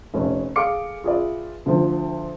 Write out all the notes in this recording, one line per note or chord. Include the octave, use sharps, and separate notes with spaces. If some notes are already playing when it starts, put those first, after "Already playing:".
F1 C#4
G#4 A4 F5 D6 C#7
F4 G#4 B4 D5 E5
D2 D3 F3